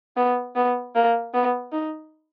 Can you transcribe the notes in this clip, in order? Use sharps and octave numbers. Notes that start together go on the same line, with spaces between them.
B3
B3
A#3
B3
D#4